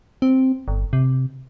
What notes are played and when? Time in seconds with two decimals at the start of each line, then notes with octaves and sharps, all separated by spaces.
0.22 C4
0.68 G1
0.93 C3